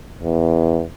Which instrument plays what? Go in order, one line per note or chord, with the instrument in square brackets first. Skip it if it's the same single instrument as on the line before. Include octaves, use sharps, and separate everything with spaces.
[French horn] E2